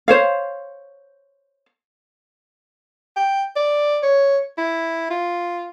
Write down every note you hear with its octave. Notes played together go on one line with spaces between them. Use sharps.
C5 C#5 F5
G5
D5
C#5
E4
F4